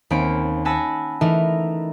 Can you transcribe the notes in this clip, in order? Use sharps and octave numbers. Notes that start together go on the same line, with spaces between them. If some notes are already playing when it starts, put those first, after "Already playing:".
D#2 A#3 C4 C#4 B5 D7
F#5 G#5 A5 B5 E6 A#6
E3 A3 D#4 E4 A#4